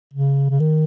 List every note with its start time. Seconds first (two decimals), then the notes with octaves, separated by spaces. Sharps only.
0.13 C#3
0.50 C#3
0.60 D#3